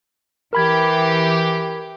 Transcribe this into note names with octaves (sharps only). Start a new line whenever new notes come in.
E3 G4 A#4 B5 G#6